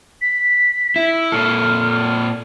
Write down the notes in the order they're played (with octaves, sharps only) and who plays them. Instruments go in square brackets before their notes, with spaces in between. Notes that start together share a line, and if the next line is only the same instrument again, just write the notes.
[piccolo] B6
[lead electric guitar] E4
[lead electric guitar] A#2 A4 [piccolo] F6